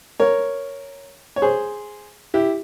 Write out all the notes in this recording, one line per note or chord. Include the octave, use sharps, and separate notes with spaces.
A#4 C#5
C#5
G#4 C5
E4 G4